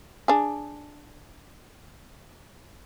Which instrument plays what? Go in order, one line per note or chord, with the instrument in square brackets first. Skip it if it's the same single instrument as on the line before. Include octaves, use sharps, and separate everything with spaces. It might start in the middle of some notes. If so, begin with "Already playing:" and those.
[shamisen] D4 G#4